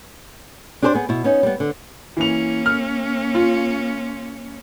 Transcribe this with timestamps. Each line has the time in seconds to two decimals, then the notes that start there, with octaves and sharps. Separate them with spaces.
0.82 D4 G4 G#4 B4 C5 D5
0.94 B3 G#4
1.09 B2 E4
1.24 B3 C#4 D#4
1.43 G3 B3
1.60 D3
2.17 E3 A#3 C#4 F7
2.66 F6
3.35 F4